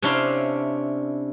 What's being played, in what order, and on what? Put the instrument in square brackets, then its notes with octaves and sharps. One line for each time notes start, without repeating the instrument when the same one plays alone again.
[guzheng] C3 C#4 D4 E4 F5 C6